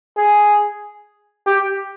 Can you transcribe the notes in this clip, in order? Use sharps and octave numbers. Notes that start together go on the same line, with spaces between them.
G#4
G4